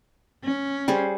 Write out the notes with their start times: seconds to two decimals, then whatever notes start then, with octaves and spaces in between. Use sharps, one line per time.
0.44 C#4
0.88 G3 G#4 C5